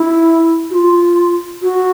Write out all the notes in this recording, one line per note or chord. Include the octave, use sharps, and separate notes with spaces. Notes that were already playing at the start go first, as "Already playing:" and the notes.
Already playing: E4
F#4
F4
F#4